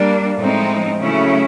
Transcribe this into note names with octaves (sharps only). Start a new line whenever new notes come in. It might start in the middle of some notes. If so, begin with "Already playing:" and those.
Already playing: G3 A#3 D4
A2 F3 G#3 C4 D#4
C#3 F#3 A3 C#4 E4